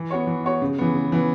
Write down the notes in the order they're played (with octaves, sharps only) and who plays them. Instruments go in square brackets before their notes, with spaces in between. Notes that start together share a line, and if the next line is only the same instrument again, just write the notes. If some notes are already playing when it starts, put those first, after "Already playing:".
Already playing: [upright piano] E3
B3 F#4 C#5
E3
B3 F#4 C#5
C#3
E3 B3
C#3
E3 B3